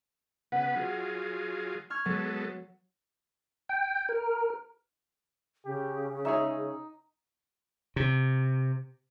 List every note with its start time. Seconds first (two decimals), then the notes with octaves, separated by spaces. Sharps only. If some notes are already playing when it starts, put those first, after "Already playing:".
0.52 C#3 B3 B4 F#5 G5
0.76 F#3 F4 G#4
1.90 C#6 F6 G#6
2.06 F#3 G#3 B3 A4
3.69 G5
4.09 A#4
5.65 C#3 G4
6.25 G#3 D#4 G#4 C#5 E5
7.96 C3